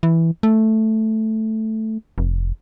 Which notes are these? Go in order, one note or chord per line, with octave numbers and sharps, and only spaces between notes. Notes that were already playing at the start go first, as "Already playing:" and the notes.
E3
A3
F1